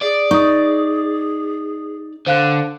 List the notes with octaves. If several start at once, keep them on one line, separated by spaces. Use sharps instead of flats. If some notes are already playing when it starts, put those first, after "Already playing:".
G#4 D5
D#4 C#6 D#6
D3 C5 F5 F#6